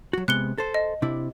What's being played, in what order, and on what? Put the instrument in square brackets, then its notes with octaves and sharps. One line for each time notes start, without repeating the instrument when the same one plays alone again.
[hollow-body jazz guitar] F#3 F#4
[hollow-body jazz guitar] C3 G#3 B3 [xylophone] F#6 C#7 G7
[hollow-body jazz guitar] A4 C5
[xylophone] D#5
[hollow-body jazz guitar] C3 D4 E4